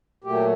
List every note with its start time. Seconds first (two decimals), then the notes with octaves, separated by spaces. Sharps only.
0.24 A#2 F#3 A3 G4